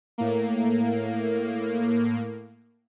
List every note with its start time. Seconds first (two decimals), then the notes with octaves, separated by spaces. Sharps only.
0.18 A2 A#3